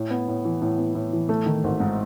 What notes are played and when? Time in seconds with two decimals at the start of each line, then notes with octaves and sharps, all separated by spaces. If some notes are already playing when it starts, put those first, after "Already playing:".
Already playing: A2
0.10 B3
0.28 A2
0.45 E3
0.62 A2
0.78 B3
0.95 A2
1.13 E3
1.29 A3
1.46 D#3
1.64 G#1
1.80 G#2